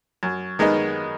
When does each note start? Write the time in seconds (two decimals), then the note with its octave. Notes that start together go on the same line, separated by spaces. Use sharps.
0.23 F#2
0.59 D#3 G#3 B3 D#4